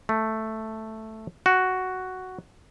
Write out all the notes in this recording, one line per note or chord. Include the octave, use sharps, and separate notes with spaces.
A3
F#4